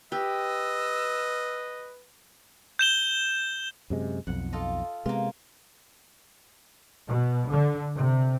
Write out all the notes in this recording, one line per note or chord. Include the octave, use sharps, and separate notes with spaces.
G4 B4 D#5 E6
G6 E7 G7
F#2 C3 G#3
B1 F2 F#5
F4 A4 D#5
C3 G#3 A#3 B3 F4
B2
D3
C3